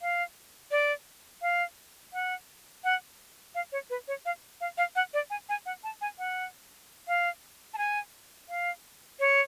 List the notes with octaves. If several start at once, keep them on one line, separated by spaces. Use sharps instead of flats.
F5
D5
F5
F#5
F#5
F5
C#5
B4
C#5
F5
F5
F5
F#5
D5
G#5
G#5
F#5
A5
G#5
F#5
F5
A5
G#5
F5
C#5